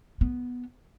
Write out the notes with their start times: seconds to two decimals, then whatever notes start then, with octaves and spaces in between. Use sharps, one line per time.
0.21 B3